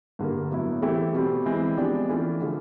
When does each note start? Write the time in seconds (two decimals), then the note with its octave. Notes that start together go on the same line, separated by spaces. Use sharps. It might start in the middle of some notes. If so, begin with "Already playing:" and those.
0.19 G2 D3 G3 A#3
0.51 A2 F#3 B3 E4
0.82 E3 A3 C4 E4 G4
1.14 B2 G3 C4
1.46 E3 G#3 C4
1.78 F3 G#3 B3 D4 G4
2.09 E3 A3 C#4 F4
2.42 D3 F3 A3